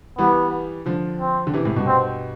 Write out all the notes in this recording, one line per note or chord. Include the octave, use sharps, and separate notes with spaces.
E3 G3 B3
D3 F3
C4
D3
C3 E3
A2 C3
G2 B2
C4